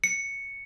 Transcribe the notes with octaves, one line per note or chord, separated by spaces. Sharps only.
C#7